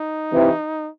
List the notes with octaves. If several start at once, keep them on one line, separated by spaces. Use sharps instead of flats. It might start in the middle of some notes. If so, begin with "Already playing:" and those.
Already playing: D#4
C3 E3